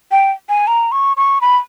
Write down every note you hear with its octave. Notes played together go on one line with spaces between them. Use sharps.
G5
G#5
A#5
C#6
C#6
B5